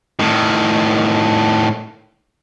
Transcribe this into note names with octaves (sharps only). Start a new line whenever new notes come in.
A2 D#3